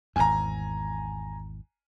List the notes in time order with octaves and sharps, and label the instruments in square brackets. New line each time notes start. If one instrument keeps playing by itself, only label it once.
[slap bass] G#1 E2 [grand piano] G#5 A#5